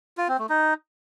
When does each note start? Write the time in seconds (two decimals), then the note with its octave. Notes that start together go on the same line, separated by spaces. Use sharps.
0.18 F4
0.28 C4
0.39 A3
0.49 D#4